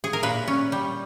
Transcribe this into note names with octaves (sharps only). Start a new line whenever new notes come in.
G#4
A#4
A#2 B4
C#4
G3